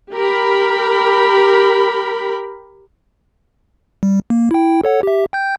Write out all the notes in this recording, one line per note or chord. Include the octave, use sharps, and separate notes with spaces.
G4 A#4 B5
G3
A#3
E4 G5
A4 C#5 F#5
G4 E5
G5 G6